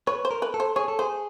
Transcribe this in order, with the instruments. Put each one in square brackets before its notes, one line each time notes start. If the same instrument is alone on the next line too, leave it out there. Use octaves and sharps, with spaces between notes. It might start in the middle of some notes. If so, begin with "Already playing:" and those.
[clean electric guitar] B4 [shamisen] C#5
[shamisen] C5
[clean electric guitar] A#4
[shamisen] B4
[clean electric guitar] A4
[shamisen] C5
[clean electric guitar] G#4 [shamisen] C#5
[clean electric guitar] A4
[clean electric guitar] G#4 [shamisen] C5